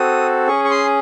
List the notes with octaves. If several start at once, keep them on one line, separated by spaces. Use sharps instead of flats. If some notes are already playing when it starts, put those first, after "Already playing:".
Already playing: C4 F#4 A4 D#6
C#4 G#4 C#6
C#6
C6